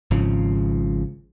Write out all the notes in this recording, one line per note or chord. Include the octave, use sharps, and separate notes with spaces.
G#1 G#2 C#3 F3